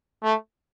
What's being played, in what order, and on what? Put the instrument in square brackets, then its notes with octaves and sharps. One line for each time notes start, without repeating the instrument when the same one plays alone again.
[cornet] A3